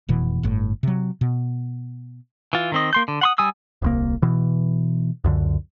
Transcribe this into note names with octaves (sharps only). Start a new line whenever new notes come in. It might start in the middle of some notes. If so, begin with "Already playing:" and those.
F1 B2 E3
G1 A2
C3 F#3
B2
E3 F4
D#3 C4 D#5
A#3 C6 G6
D3
F#5 C6 D#6
G3 G#5 D#6 E6
D#1 C2 A#3
B2 E3
C#2 F#2 D3